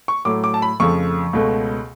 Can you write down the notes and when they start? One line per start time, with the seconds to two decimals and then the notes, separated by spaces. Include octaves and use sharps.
0.08 C#6
0.25 A2 F#3 A3 D6
0.44 D6
0.54 A5
0.62 B5
0.80 F2 C#3 F3 A3 C#6
1.33 C#2 B2 A3